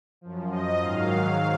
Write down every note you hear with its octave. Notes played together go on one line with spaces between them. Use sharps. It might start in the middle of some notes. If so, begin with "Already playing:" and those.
F#2 F3
D#5
G#2 D#3 F#3 F5